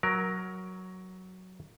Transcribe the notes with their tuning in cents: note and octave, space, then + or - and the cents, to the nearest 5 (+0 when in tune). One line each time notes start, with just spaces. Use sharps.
F#3 +0 A#4 +10